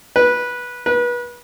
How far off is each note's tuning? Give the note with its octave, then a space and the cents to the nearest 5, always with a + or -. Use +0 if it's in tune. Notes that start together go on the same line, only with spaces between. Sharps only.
B4 -15
B4 -30